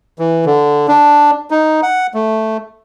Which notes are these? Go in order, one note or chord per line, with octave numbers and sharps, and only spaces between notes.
E3
D3
D4
D#4
F#5
A3